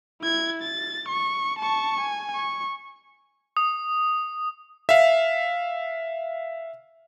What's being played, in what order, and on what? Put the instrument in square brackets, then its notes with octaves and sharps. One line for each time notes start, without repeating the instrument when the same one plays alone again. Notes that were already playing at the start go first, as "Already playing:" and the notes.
[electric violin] E4 G#6
A6
C#6
A5 C#6
G#5
C#6
[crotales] D#6
[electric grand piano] E5 F5